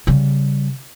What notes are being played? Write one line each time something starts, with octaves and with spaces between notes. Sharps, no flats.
C#3 G3